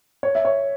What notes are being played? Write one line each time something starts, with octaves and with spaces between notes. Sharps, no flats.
C#5
E5
C#5